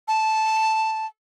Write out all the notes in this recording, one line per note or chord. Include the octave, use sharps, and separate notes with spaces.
A5